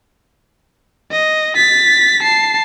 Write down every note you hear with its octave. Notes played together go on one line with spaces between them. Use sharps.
D#5
A6 B6
A5 C7